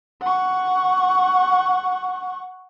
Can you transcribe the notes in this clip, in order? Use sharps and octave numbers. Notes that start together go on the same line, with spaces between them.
F#5 C#6